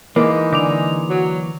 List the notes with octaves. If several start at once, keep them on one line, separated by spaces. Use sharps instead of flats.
E3 G#3 A#3 D#4 D6
D3 D6 F7
F#3